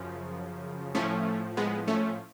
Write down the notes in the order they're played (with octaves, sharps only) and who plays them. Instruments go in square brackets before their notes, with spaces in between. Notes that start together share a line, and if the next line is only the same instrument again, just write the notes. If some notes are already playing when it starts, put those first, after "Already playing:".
Already playing: [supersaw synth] F#2 C#3 F3
A2 F3 A3 C#4
G#3 B3
A3 C#4